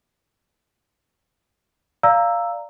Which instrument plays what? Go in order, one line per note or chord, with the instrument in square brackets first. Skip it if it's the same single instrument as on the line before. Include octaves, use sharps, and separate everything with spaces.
[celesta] D5 F5 A#5 E6